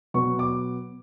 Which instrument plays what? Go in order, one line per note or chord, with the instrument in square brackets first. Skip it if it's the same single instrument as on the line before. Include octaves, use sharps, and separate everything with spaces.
[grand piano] B2 F#3 B3 C#6
D6